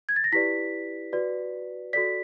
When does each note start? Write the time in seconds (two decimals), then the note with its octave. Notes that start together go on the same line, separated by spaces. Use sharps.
0.09 G#6
0.16 A6
0.24 A#6
0.32 E4 G4 B4 D5 B6
1.13 F#4 B4 D5
1.93 F#4 A4 D5 B6